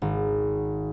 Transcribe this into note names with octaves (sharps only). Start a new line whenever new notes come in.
G#1